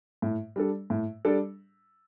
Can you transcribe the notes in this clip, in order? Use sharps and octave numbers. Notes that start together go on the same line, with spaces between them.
A2
G3 D4 A4
A2
G3 D4 A4